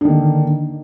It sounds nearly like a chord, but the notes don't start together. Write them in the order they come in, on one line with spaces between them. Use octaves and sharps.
D3 D#3 A#3